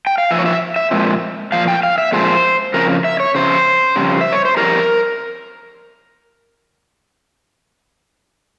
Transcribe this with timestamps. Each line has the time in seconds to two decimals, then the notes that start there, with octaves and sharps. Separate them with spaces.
0.07 G5
0.18 F5
0.31 A#2 F3 E5
0.39 C#5
0.46 E5
0.76 E5
0.91 A#2 F3 G#3 C4
1.52 A#2 F3 F5
1.68 G5
1.83 F5
1.98 E5
2.12 A#2 F3 G#3 C4 C5
2.74 F2 C#3 A#4
3.05 E5
3.20 C#5
3.35 F2 C#3 C5
3.96 F2 C#3 G3
4.21 E5
4.32 C#5
4.45 C5
4.57 F2 C#3 E3 G3 A#4